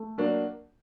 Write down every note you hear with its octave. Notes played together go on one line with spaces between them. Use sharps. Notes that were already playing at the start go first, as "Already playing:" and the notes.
Already playing: A3
F#3 A#3 D4 F#4